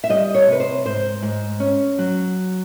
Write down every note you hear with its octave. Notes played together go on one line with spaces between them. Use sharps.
E5
G3 D#5
C#5
C3 B4
C5
G#2 C5
G#2
C#4
F#3